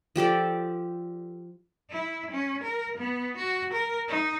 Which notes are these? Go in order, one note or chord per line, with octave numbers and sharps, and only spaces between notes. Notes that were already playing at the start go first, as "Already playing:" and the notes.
F3 G4 A4 D5
E4
C#4
A#4
B3
F#4
A#4
D#4